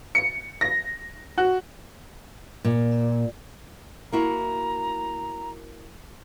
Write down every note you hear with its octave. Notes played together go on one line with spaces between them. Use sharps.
C#7
A#6
F#4
A#2
A#3 E4 F#4 A#5